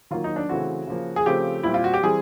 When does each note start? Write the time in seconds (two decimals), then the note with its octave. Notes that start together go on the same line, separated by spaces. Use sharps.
0.11 D#3 F#3 A#3 F4
0.24 D#4
0.36 D4
0.49 C#3 E3 A3 C4 F#4
0.87 C#3 F3 A#3
1.16 G#4
1.26 C#3 F3 A3 C4 G4
1.63 A#2 G3 C4 E4
1.74 F4
1.84 F#4
1.94 G4
2.03 E3 G3 C4 G#4